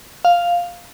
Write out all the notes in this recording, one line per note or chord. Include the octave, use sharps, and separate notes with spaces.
F5